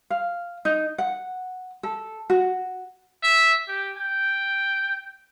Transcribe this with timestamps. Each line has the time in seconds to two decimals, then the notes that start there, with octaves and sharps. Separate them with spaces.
0.10 F5
0.65 D#4
0.98 F#5
1.83 A4
2.30 F#4
3.23 E5
3.68 G4
3.97 G5